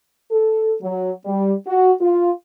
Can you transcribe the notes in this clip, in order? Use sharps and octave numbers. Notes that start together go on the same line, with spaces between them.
A4
F#3
G3
F#4
F4